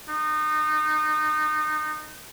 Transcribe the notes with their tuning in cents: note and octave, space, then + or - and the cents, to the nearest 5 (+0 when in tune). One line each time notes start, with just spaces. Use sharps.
D#4 -25